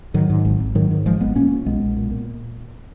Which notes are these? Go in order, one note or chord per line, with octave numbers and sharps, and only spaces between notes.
G#2 D#3 F#3
G#2
G#1
G#1
G#2 D#3 F#3
G#2
G#1 F3 G#3
G#1 G#3 B3
A#2 A#3 C#4
A#2
B1 G#3 B3
B1
A#2
A#2